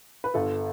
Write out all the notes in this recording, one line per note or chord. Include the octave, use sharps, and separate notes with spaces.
B4
G1 A4